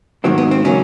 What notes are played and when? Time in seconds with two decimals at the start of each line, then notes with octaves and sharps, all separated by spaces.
0.24 G#2 D#3 F#3 A#3 C4
0.38 B3
0.51 C4
0.65 C#3 F#3 A#3 C#4